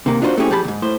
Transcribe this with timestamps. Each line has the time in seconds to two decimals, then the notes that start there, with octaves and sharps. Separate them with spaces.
0.06 C3 D#3 A#3
0.22 D4 D#4 F4 F#4 A#4 C5
0.37 A3 C4 C#4 E4 G4 G#4
0.50 F2 G4 G#4 A5 B5
0.64 D#2 G#2
0.82 A2 C5